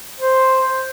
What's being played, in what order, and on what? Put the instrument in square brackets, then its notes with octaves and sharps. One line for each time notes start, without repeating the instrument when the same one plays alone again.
[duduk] C5